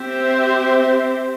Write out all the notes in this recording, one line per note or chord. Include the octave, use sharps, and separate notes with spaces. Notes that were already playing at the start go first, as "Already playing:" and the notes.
Already playing: C4 G4 C5 E5